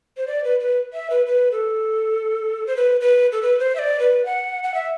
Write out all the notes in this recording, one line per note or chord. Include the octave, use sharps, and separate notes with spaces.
C5
D5
B4
B4
E5
B4
B4
A4
C5
B4
B4
A4
B4
C5
E5
D5
B4
F#5
F#5
E5